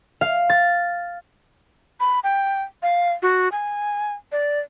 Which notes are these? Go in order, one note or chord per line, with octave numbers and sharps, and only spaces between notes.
F5
A6
B5
G5
F5
F#4
G#5
D5